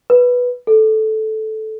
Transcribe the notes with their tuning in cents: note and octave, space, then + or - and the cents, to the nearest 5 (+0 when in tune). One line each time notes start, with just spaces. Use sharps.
B4 -5
A4 -10